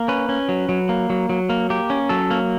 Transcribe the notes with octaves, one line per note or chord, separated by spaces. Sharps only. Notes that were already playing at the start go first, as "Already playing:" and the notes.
Already playing: A#3
C#4 B4
C#4
F#3
F#3
A#3
F#3
F#3
A#3
A#3 G4
C#4
F#3 A4
A#3